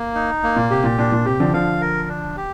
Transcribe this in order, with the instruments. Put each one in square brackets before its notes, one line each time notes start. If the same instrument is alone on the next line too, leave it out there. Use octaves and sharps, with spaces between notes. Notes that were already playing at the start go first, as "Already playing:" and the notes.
Already playing: [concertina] A#3
D#4
A#3
[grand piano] A#2
[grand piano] C3 [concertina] G4
[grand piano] A#2
[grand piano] A#2 [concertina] D4
[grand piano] A#2
[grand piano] C3 [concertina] G4
[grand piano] D3 F3
[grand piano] D3 F3 [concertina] F5
[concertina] A#4
D4
G4